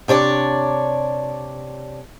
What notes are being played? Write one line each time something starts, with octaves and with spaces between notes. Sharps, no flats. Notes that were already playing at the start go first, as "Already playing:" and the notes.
C3 D4 C#5 D5